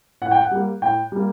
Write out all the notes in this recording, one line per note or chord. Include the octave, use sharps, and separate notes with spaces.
A2 F#5
G5
F#5
G3 A#3
A2 G5
G3 A#3